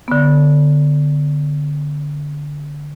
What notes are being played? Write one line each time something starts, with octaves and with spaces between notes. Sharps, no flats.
D3 B3